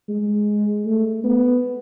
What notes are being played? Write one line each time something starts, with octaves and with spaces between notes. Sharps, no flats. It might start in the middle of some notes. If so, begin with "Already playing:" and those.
G#3
A3
B3